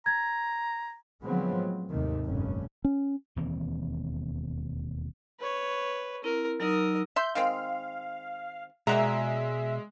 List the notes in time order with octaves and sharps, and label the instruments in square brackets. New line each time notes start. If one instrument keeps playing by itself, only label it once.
[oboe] A#5 [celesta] G#6
[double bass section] D3 F3 F#3 G#3 B3 C4
A2
D#2 G#2 C3 D#3 A3
F1 A#1 G2 C#4
[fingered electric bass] C#4
[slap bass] E1 D#2 E3 C4
[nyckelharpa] B4 C#5
[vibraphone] C4 E4 [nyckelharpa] A#4
[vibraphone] F#3 D#4 E6 [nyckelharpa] A#4 D#5
[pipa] E5 C6 [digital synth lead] G6
[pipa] D#3 G#3 C4 [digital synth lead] F5
[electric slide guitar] B2 D5 G#5 [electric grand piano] G#3 [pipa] A#3 F#4 A#5 [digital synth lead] E5